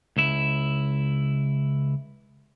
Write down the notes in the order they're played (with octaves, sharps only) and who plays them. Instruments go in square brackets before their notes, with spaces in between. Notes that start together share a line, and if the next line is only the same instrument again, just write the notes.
[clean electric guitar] C#2 E4